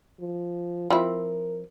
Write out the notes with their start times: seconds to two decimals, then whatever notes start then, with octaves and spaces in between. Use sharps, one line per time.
0.20 F3
0.90 F3 C4 E4 A#4